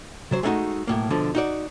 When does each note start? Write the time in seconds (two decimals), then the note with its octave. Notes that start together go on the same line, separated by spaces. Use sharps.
0.31 C3 F#3 C5
0.43 G#3 A3 B3 D4 D#4 F#4
0.87 B1 A2 A#3
1.10 B2 D3 F3
1.35 D#4 F#4 D5